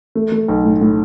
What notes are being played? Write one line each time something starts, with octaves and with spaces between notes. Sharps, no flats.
A3
A3
B1
A2
A2